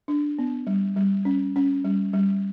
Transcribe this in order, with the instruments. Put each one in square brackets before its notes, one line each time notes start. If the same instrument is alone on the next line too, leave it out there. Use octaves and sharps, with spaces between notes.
[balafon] D4
B3
G3
G3
C#4
C#4
G3
G3